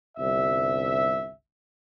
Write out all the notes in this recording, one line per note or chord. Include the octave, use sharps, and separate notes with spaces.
G1 C2 E5